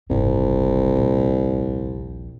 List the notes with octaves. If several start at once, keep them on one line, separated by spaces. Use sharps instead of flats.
F#1 C2 G#2
A#1 D#2